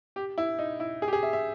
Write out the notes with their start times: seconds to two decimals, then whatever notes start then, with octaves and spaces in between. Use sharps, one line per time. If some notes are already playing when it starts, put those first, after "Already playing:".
0.16 G4
0.38 E4
0.59 D#4
0.80 E4
1.02 G#4
1.08 G4
1.13 G#4
1.23 E5
1.33 E5